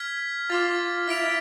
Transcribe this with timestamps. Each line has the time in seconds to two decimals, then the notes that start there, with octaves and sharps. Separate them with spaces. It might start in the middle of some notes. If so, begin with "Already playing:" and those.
Already playing: F6 G#6 B6
0.50 F4 D6 F6 A6
1.08 E4 F6 B6 D7 F7